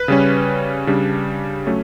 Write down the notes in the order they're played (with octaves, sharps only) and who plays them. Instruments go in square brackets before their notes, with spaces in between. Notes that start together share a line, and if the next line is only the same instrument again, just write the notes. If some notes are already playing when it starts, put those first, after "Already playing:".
Already playing: [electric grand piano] B4
C#3 G3 C#4
C#3 G3 D4
F#3 A3 C#4